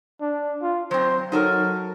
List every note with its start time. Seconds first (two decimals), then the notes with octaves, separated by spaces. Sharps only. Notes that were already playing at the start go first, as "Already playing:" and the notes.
0.21 D4
0.62 F4
0.91 F#3 C4 C5
1.32 F#3 D#4 A4 A#4